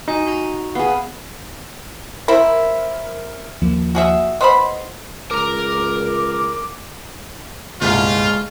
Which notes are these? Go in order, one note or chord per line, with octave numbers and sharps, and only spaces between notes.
D#4 F#4 G#5
F#4 A#5
B3 G#4 F5
C4 E4 A#4
D#2 F3 A#3
F#4 G#4 E5
B3 C5 D#5 B5 C6
C#2 A#4 A#5 D6
G1 C2 A#2 G#3 F4